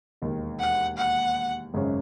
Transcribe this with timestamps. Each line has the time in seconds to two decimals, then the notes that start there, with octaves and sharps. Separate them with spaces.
0.22 E1 D#2 D#3
0.60 F#5
0.97 F#5
1.74 G#1 F#2 C#3 G#3 C#4